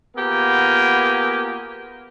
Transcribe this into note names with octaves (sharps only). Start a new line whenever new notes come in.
A#3 B3 F4 G4 G#4 A#4